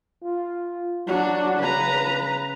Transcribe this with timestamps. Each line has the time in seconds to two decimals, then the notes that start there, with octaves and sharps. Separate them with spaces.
0.23 F4
1.07 F#3 D4 F#4
1.59 C#3 B4 A#5